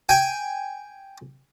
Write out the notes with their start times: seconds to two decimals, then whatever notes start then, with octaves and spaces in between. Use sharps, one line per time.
0.09 G5 G#5